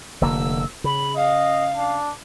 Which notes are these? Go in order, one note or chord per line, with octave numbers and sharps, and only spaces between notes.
F1 D3 A#3 E6
C#3 B5
D#5 F5
D4